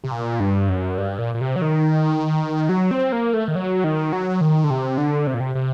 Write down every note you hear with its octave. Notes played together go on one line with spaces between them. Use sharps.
C3
A#2
G2
F#2
G2
A#2
A#2
C3
F#3
D#3
F#3
C4
A#3
A3
D#3
F#3
D#3
F#3
D#3
D3
C3
D3
C3
A#2
C3
C3